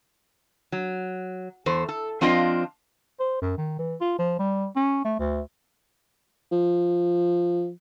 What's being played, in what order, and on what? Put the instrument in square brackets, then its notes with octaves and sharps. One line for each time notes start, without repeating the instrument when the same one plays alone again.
[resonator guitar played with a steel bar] F#3
E2 A4 C5
A4
F3 C4 D4 F4 D#5
[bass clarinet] C5
F#2
D#3
E3
F4
F3
G3
C#4
A3
D2
[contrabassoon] F3